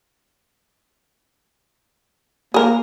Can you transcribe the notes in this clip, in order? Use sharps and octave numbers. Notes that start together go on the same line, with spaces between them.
A#3 G#4 A#4